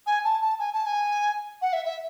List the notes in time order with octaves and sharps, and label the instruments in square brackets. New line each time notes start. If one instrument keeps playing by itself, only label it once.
[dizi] G#5
A5
A5
G#5
A5
G#5
F#5
E5
E5